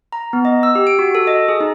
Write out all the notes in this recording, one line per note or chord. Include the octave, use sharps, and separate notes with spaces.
A#5
B3
D#5
E6
G4
D7
F#4
A4
D#5
G#4
D#4